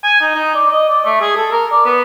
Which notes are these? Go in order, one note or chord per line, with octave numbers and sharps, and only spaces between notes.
G#5
D#4
D#4
D5
D#5
D5
A3
G#4
A4
A#4
D5
B3